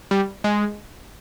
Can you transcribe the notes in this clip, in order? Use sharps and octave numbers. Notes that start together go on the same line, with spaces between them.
G3
G#3